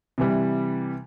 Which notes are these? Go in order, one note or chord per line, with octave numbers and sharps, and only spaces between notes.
C3 E3 G3